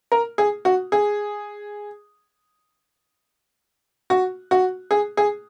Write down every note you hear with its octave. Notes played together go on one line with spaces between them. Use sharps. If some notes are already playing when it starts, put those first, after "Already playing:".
A#4
G#4
F#4
G#4
F#4
F#4
G#4
G#4